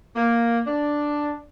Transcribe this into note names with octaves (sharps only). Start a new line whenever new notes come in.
A#3
D4